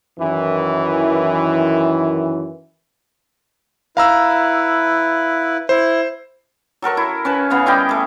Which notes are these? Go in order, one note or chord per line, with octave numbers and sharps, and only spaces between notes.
F#2 D#3 E3
E4 B4 F5 A#5 E6
E4 C5
F#3 A4 A#4 C#6
E4
C#4 B4 A5
C#3 B3 F5
G3 E4 D#5 G5
A3 G#4